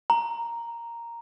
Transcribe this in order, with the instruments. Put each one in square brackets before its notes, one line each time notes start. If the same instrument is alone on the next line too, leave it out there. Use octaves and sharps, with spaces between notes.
[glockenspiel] A#5